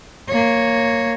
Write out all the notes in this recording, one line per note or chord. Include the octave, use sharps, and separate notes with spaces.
A#3 C#5